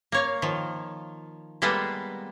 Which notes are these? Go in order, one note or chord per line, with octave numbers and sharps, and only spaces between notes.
A#3 C#5 F5
D#3 F3
G3 G#3 A#3 B3 G#4 A4